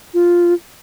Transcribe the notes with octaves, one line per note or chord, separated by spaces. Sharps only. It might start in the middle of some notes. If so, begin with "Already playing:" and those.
F4